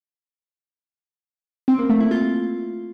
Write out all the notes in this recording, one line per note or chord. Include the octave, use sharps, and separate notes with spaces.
C4
A#3
A3
E4
F4